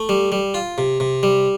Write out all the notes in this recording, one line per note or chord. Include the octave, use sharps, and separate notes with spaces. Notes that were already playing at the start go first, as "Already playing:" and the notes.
Already playing: A3
G3
G3
F4
C3
C3
G3